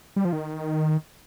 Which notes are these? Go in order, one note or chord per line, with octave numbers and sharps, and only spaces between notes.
G3
F3
D#3